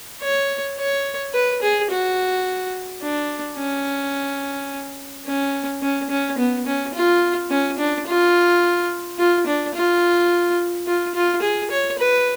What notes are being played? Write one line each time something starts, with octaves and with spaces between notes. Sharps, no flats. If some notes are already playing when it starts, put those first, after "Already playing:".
C#5
C#5
B4
G#4
F#4
D4
C#4
C#4
C#4
C#4
B3
C#4
F4
C#4
D4
F4
F4
D4
F4
F4
F4
G#4
C#5
B4